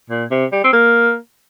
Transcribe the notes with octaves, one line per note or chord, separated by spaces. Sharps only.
A#2
C3
G3
C4
A#3